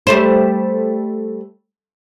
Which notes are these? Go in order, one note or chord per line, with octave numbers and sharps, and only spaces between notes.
G3 A3 C5